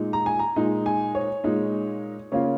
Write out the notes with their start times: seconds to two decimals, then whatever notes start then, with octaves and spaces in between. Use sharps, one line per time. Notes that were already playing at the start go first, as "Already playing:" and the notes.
Already playing: A#2 G#3 D#4
0.13 A#5
0.26 G#5
0.39 A#5
0.56 A#2 G#3 D#4
0.86 G#5
1.15 C#5
1.44 A#2 G#3 D#4
2.32 C#3 A#3 F4 C#5